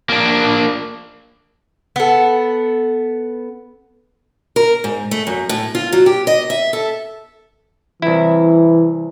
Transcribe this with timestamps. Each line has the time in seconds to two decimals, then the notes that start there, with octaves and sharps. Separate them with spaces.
0.09 A#3 D4
1.96 B3 A4
4.56 A#4
4.84 G#2
5.11 A3
5.27 F#2
5.49 A2
5.75 F4
5.92 F#3
6.06 G4
6.27 D#5
6.50 E5
6.73 A4
8.02 C2 E3 E4